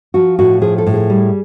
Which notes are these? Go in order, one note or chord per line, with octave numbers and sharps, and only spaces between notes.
F3 F#4
A2 F#4
F3 G#4
A4
A2
G#4
G3